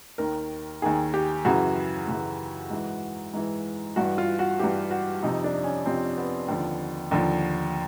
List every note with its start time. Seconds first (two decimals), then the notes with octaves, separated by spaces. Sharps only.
0.18 D#2 D#3 A#4
0.82 D#2 D#3 G#4
1.14 G4
1.45 F#2 C#3 E3 F#4
2.08 F#2 C#3 E3
2.70 G#2 E3
3.33 G#2 E3
3.96 G2 E3 F#4
4.18 F4
4.39 F#4
4.59 G2 E3 G4
4.91 F#4
5.22 F2 C3 F3 D#4
5.44 D4
5.64 C#4
5.85 F2 C3 F3 C4
6.18 B3
6.48 D#2 D3 F3
7.11 D#2 D3 F3